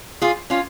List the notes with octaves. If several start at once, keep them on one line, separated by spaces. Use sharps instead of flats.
F4 G#4
C#4 F4